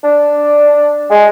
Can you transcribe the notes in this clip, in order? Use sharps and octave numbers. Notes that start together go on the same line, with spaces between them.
D4
G#3